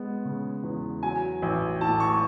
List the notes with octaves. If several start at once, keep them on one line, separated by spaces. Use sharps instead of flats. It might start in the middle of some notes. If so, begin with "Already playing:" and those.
Already playing: G#3 B3
C#3
E2
F#3 G#5
A1
A2 A5
C#6